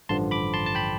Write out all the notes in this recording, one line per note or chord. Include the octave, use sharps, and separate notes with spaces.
A1 G2 D3 F3 A5 C6
B5 D6
A5 C6
A5
G5 B5